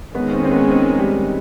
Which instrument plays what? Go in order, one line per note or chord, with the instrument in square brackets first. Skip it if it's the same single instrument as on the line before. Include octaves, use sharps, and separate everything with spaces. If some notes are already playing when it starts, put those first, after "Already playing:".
[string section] D#3 G#3 C#4 [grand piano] B3
[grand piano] C4
C4
B3
C4
G3